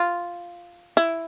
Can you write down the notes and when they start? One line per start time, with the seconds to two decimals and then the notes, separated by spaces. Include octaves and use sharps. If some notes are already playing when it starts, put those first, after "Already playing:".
Already playing: F4
0.97 E4